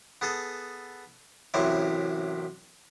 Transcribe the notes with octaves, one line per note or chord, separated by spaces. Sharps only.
B3 G#4 A4
A1 F#2 C3 F#3 E4 E5